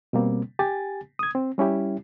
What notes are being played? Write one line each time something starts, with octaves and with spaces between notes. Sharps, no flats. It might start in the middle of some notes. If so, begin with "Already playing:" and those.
B2 G3 A#3 C4
G4 G#5 A6
D#6 G#6
C4
G3 C#4 E4 G4